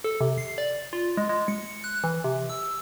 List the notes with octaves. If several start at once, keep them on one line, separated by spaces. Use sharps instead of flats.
A4
C3
C7
D5
F4
G#3
G#3
C#7
F#6
E3
C3
E6